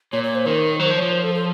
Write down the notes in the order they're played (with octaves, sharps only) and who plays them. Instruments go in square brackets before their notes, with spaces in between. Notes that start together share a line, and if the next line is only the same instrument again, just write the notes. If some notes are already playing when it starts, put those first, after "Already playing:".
[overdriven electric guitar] A#2 [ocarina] C#5
[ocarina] C#5
C5
[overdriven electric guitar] D#3 [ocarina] A#4
[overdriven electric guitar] F#3 [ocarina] C5
[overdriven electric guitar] F3
[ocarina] C#5
[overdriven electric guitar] F3
[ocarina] C5
A4
A4